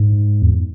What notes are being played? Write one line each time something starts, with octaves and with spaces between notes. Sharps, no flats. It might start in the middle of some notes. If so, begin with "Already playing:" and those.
Already playing: G#2
E2